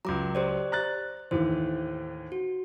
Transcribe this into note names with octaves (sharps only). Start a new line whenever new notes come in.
C#2 F#3 A#5 D6
G4 C5 D5
A#5 F#6 A6
D#2 A2 E3 C5
F#4